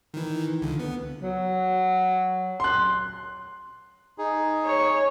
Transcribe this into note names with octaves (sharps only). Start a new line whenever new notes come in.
D#3 E3
C#2 D3
B3
F#3
C6 F#6
D#4 G#4
C#5